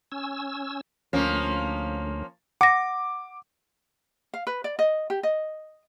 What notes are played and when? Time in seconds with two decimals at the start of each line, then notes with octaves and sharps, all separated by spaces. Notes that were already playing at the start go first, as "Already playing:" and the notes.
0.12 C#4 E6
1.13 D2 F3 A#3 C#4
2.61 F#5 D6 A#6
4.34 F5
4.47 B4
4.64 D5
4.79 D#5
5.10 G4
5.23 D#5